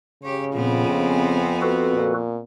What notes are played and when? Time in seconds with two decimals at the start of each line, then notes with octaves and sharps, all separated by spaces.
0.23 C#3 G4 C#5
0.54 F2 A#2 B3 C4
0.87 G#5
1.61 F#4 A4 B4
1.93 A#2